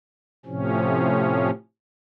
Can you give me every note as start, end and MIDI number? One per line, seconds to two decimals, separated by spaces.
0.46 1.50 45
0.46 1.50 48
0.46 1.50 53
0.46 1.50 61